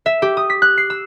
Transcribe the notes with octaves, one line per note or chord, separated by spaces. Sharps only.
E5
G4
D#6
B6
F#6
C7
E6